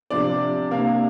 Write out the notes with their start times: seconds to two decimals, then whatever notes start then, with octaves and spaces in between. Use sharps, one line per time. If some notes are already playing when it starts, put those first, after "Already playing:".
0.10 C3 F3 D4 D5
0.71 C3 A#3 D4 F5